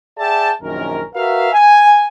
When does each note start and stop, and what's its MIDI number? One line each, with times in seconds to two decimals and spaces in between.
0.18 0.51 68
0.18 0.51 74
0.18 0.51 76
0.18 0.51 79
0.18 0.51 81
0.63 1.02 34
0.63 1.02 42
0.63 1.02 51
0.63 1.02 61
0.63 1.02 70
1.14 1.49 66
1.14 1.49 70
1.14 1.49 71
1.14 1.49 76
1.14 1.49 77
1.53 2.06 80